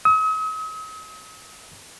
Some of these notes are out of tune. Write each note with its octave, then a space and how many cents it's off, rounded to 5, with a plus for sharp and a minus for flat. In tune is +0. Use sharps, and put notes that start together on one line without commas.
D#6 +45